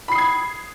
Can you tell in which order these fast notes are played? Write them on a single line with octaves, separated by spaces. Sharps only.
B5 C7 D#6 G#6